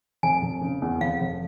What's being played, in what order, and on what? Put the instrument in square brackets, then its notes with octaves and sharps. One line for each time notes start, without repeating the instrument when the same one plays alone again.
[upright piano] F1 [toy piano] G#5
[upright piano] F1
C#3
E2
[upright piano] F1 [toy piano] F5
[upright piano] F1